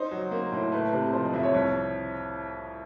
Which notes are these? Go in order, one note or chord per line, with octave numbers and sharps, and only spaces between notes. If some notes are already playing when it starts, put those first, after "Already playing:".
Already playing: D#4 C5
F#3
A#3
A2
A3 B4
C3
F3 C5
D#5
F2 E5
C#5
C2 C#5